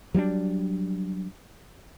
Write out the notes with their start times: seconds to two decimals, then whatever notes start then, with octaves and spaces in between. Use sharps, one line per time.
0.14 F#3 G3 C#4 D4